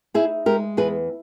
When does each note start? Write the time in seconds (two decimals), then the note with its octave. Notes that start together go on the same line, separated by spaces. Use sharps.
0.14 D#4 E4 G#4
0.46 G#3 G4 A#4
0.77 E2 G#4 B4